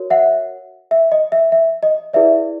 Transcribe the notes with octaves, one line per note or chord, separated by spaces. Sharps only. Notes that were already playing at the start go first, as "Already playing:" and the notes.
Already playing: F#4 A#4 C#5
E5 F#5
E5
D#5
E5
E5
D#5
E4 G#4 B4 D5 E5